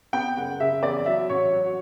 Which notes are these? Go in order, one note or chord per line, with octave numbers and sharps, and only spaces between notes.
B3 G5
F#1 F#5
C#3 E5
E2 D5
F#3 E5
A1 C#5
F#3